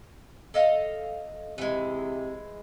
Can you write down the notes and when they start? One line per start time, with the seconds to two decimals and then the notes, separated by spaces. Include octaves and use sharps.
0.54 A4 D#5 F5
1.58 C3 E3 G#3